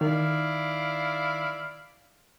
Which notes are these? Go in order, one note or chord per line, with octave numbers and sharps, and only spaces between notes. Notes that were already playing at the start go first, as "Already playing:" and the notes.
D#3 E4 D5 F5